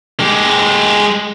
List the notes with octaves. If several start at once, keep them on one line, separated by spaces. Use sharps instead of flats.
G#3 G4